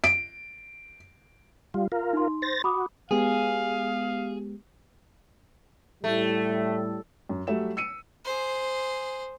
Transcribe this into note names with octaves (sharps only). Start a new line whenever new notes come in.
D7
G3 F4
F4 A#4
D#4 C6
C5 A6 A#6
F#4 B5 D6 D#6
G#3 B3 G4 G#4 F5
A2 G3 A3
F#2
F#3 G3 A3 E5 E7
E6 C#7 D#7
G#4 C5